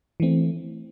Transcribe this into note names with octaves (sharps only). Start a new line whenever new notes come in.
E3 A3 C4